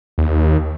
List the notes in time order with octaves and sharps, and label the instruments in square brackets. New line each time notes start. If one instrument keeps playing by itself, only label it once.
[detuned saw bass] D#2